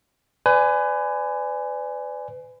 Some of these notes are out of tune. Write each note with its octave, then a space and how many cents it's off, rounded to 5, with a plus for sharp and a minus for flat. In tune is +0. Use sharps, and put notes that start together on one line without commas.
B4 +35 D5 +0 G#5 +0